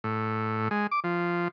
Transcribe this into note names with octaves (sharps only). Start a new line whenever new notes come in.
A2
G#3
D6
F3